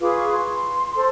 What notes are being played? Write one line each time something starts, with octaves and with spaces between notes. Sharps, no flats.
F4 G#4 B4 D6
C#6
C6
A4 C5